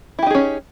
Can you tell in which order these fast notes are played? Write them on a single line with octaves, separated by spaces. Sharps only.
E4 G4 D#4 G#4 C#4